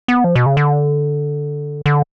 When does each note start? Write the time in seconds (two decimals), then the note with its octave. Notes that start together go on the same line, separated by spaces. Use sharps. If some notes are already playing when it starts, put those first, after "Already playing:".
0.08 B3
0.24 F3
0.35 B2
0.46 C#3
0.57 D3
1.86 D3